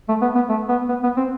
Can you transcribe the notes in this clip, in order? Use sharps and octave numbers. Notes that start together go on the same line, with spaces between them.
A3
B3
B3
A3
B3
B3
B3
C4